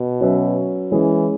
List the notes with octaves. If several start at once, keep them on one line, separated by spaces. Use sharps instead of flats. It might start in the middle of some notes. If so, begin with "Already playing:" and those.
Already playing: B2
F#3 C#4 F#4 B4 E5
E3 G#3 C#4 E4 G#4